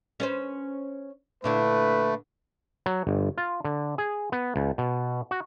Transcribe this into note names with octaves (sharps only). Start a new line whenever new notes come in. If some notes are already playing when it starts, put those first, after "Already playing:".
C#4 B4 C5
A#2 D3 A3 E4 B4
F#3
G1
F4
D3
G#4
B3
C#2
B2
F#4